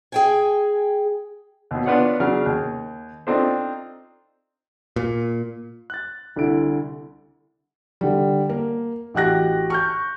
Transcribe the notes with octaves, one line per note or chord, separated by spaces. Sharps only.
G#4 G5 G#5
D#2 B2
B3 D4 F4 B4 C#5 F#5
C#3 F#3 D4 F6
D#2
C4 D4 D#4 F4 A4 C5
A#2
F#6 A6
C2 D3 E4 D7
D3 G3
A#3
A1 F#4 G4 F#6 A#6
C#6 F6 G6